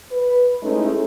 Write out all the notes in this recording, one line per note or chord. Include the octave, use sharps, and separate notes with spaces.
B4
G#3 A3 C#4 D#4 E4